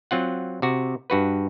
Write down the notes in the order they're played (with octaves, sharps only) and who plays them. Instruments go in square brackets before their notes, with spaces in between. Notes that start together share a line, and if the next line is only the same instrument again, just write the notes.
[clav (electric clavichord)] F#3 C4 F4 F#5
C3 F#4
G2 F#4 B4